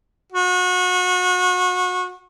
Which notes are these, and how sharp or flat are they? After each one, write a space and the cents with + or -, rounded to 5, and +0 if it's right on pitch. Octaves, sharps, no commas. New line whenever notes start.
F#4 -30